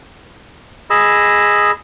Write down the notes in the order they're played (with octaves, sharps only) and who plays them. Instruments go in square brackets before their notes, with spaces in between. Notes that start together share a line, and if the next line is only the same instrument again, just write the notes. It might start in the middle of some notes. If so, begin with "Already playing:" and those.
[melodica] G#4 D#5 B5 E6